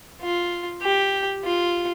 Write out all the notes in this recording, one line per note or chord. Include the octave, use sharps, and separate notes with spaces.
F4
G4
F4